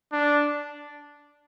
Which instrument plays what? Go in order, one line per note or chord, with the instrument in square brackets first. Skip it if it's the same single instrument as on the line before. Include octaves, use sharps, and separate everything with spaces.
[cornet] D4